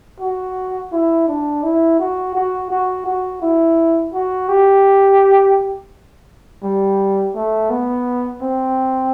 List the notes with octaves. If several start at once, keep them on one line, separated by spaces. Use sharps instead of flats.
F#4
E4
D4
E4
F#4
F#4
F#4
F#4
E4
F#4
G4
G3
A3
B3
C4